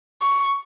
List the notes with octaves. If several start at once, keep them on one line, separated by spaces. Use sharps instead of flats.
C#6